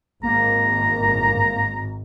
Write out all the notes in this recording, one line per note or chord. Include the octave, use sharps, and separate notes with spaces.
G#1 A#3 A#5